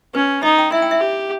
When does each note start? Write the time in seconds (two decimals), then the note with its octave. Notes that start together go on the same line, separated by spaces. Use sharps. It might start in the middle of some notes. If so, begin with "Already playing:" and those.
0.15 C#4 B4
0.43 D#4 D#5
0.58 G5
0.72 E4 E5
0.82 G5
0.91 E5
1.01 G4